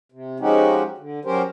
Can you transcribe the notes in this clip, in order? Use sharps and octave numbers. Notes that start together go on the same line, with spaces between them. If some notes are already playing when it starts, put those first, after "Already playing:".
C3
F3 G#3 C#4 D#4 F#4 G4
D3
F#3 C#4 G4 A#4 C5